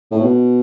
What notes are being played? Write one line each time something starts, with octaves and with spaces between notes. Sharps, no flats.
A2
B2